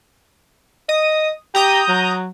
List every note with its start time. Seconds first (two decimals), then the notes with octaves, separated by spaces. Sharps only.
0.89 D#5 D#6
1.55 G4 A#5 D#6 G6
1.88 F#3